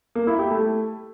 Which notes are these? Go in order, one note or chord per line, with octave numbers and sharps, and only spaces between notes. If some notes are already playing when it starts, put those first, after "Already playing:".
A#3
E4
G4
A3